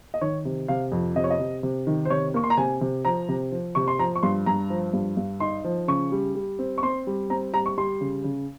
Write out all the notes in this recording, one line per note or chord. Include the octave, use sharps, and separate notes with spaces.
D#5
D#3 C#5
C3
C3 F5
F2
C3 D#5
C#5
D#5
C3
C3
D#3
C5
C3 C#5
A#3 C#6
C6
A#5
C3 G#5
C3
F3 A#5
C3
F3
C3 C#6
C6
F3 A#5
C#6
G2 C6
G2 A#5
F3
G2
G2
D#4 C6
F3
C#3 C#6
G3
G3
C4
C#6
C4 C6
G3
C4 A#5
G3 A#5
C#6
G3 C6
C#3
C#3